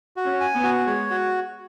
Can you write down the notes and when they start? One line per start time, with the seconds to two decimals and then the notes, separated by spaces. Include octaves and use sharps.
0.16 F#4
0.24 C#4
0.40 G#5
0.55 B3
0.64 F#4
0.86 G#3 C#5
1.10 F#4